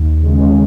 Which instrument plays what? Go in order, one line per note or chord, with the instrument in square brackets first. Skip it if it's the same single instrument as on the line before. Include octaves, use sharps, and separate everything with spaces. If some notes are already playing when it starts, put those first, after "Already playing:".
Already playing: [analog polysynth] D#2
C#3 G#3